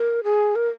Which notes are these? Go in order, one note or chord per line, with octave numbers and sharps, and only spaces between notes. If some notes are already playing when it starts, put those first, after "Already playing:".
Already playing: A#4
G#4
A#4